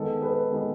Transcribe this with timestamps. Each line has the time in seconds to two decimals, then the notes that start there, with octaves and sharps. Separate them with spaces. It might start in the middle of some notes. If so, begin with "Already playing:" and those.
Already playing: D#3 G#3 B3 A4
0.21 G#4 B4
0.51 D#3 G#3 B3